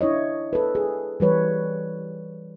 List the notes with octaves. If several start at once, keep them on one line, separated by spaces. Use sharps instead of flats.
D4 E4 C#5 D#5
A4 B4
G#4
E3 G3 B4 C#5